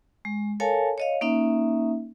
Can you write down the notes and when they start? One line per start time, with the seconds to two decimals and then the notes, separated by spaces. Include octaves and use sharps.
0.25 G#3
0.60 A4 A#4 C#5 F5 G#5 A5
0.98 C#5 D#5 F5
1.21 A#3 C#4 D#4 E5